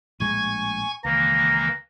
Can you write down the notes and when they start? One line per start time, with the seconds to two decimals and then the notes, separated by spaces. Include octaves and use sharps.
0.20 A#1 A2 G#3 G#5 C#6 G#6
1.05 C#2 D#3 E3 A#3 A#5